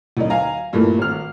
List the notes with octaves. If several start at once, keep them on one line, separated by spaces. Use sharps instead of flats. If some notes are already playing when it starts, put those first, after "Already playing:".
D2 F#3 D#4
F5 G#5 A#5
G2 A#2 E3 A3 A#3
G#1 F6